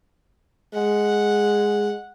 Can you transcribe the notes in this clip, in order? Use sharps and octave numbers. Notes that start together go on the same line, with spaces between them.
G#3 F#5